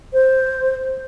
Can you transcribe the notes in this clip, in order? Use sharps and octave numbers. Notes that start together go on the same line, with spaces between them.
C5